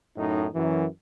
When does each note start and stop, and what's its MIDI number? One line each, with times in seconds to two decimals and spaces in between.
0.18 0.46 42
0.18 0.46 45
0.18 0.46 63
0.54 0.86 42
0.54 0.86 52